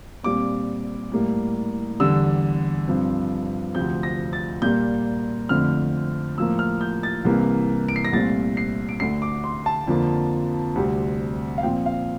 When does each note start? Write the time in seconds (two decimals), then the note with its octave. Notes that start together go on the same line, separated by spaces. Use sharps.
0.23 A#2 G3 C4 D6
1.12 A2 G3 A#3
2.00 E2 D3 G3 E6
2.88 G2 F3 C4
3.74 D2 C3 F3 C4 G6
4.03 A#6
4.33 A6
4.62 A#2 G3 A#3 G6
5.49 F2 D3 A3 C4 F6
6.38 A2 F3 A#3 E6
6.59 F6
6.81 G6
7.03 A6
7.25 C2 C3 E3 A#3
7.88 D7
7.96 C7
8.05 A#6
8.12 C2 A#2 A3 C4 A6
8.57 C7
8.89 D7
9.00 D2 D3 A3 C7
9.22 D6
9.44 C6
9.66 A5
9.88 F2 D3 F3 A#3
10.76 D2 C3 G3 C4
11.58 F5
11.63 A#2 F3 C4 G5
11.86 F5